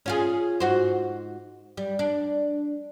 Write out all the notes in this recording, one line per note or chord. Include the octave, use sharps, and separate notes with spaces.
C#4 F4 G#4
G#2 F#4 C5
G3
D4